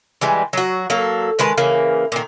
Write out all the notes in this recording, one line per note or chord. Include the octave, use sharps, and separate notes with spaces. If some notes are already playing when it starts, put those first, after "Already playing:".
E3 G3 G#3
F#3 F#4
F#3 A#3 A4
D#3 G#3 B4 A5
C#3 E3 A#3
A#2 D#3